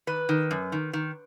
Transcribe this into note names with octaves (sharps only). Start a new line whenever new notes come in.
D#3 B4
D#3
F#2
D#3
D#3